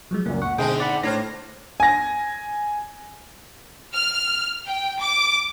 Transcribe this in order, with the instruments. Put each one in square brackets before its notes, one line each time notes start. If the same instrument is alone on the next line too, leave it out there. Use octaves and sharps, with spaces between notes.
[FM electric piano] F3 F#3 G#3
[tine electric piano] C#2 F#2 A#2 [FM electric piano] A#3
[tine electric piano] F#5 [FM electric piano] C#6
[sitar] G#2 D3 C4 [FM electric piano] B2 [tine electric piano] G#3 G#4 G5
[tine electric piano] D5 F#5 B5
[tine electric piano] A2 [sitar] D4 C5 [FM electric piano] F6 G#6 A#6
[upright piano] G#5 A#6
[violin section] F6
G5
D6